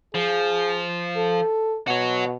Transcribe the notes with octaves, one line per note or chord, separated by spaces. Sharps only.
F3 G#4
A4
B2 F#4 C#5